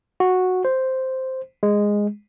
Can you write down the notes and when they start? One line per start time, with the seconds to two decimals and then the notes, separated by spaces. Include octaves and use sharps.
0.20 F#4
0.65 C5
1.63 G#3